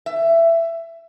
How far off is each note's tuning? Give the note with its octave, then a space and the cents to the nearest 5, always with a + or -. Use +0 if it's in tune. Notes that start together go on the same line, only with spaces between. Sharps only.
E5 +15